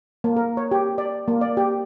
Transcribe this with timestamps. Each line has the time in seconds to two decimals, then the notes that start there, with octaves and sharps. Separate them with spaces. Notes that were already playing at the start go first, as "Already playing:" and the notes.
0.24 A#3
0.36 A#4
0.57 C#5
0.72 G4
0.98 D5
1.28 A#3
1.41 D5
1.57 G4